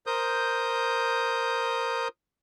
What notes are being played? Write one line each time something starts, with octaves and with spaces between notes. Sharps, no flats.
A#4 C5 D#6 G6